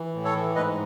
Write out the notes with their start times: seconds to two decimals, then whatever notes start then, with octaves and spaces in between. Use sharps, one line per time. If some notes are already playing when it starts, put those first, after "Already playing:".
Already playing: E3
0.15 A2
0.25 A4 C#5
0.35 E3
0.55 G#2 B4 D#5